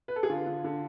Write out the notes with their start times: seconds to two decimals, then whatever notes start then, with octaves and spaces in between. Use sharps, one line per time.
0.08 B4
0.16 A4
0.23 G#4
0.30 D3 F4
0.47 D3
0.64 D3